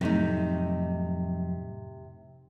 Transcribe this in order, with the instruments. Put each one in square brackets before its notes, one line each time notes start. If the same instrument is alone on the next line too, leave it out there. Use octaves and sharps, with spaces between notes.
[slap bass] F2 A2 F#3 [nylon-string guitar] C3 A3 D#4